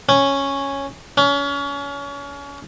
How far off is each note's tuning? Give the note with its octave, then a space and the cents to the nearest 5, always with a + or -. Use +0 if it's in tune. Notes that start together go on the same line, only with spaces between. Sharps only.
C#4 -5
C#4 +30